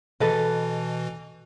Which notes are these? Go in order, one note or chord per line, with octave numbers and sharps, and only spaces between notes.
B2 E3 A4 B4 D#5